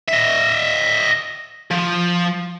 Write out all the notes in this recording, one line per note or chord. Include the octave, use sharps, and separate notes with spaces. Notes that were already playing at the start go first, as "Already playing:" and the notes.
D#5 E5
F3